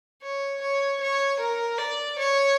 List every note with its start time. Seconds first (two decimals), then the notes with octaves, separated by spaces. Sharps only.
0.22 C#5
0.61 C#5
1.01 C#5
1.40 A#4
1.79 D5
2.19 C#5